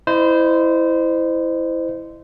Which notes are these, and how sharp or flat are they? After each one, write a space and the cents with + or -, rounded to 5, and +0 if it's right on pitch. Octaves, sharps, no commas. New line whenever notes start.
E4 +0 C5 -20 D#5 -35